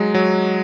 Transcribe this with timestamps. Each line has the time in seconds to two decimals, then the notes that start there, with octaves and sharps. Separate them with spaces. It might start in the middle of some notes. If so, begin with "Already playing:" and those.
Already playing: F#3 G#3 D#4
0.14 F#3